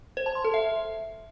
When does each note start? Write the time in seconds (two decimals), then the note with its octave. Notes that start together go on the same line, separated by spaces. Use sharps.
0.17 C5
0.26 A5
0.35 C6
0.45 A4
0.54 E5